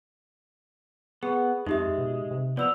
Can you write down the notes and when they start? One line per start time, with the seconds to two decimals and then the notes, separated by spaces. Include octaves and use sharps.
1.23 B3 G#4
1.67 F2 G#3 D#4 G4 E5
1.98 B2
2.31 C3
2.57 F3 B3 D5 E6 F7